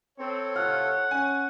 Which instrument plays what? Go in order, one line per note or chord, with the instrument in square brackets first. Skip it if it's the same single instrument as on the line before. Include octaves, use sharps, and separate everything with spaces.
[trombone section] C4 [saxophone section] A4 C#5
[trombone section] A2 C3 F4 [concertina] F#5 [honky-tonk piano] F6
[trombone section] C#4 [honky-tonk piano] G#5